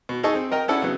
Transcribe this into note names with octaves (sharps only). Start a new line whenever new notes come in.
B2
D#4 G#4 A4 D#5 C#6 D#6
C4
A#4 D#5 G5 A#5
C#4 D4 E4 A4 F#5
C#3 F#3 B3